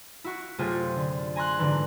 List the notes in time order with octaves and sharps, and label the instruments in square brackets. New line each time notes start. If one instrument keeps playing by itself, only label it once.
[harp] E4 F#4
F#2 C3 A3 F4 G#4 G6
D3
G#5 A#5 C6 F#6
G#2 D3 E3